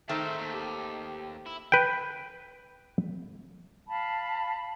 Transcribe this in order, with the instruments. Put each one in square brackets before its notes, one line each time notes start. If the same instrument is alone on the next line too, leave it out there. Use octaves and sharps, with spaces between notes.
[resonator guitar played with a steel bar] D#3 A3 C4 [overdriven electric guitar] G#4 C5
[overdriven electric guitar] D#2
[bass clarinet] G4
[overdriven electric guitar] E4
[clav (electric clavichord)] B4 G5
[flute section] F5 A5 B5